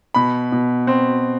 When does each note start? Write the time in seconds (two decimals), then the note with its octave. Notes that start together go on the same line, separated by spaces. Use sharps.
0.15 B2 B5
0.52 B2
0.87 C4